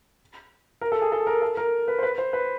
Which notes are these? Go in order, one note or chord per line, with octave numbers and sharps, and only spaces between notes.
A#4
A4
G#4
A4
A#4
A4
A#4
B4
C5
B4
C5
B4